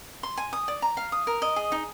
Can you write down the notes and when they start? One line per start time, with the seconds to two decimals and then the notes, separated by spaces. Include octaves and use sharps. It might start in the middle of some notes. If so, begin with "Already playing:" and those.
0.23 C6
0.37 G#5
0.53 D#6
0.68 D5
0.82 A#5
0.97 F5
1.12 D#6
1.27 A#4
1.42 D#5
1.56 G#4
1.72 D#4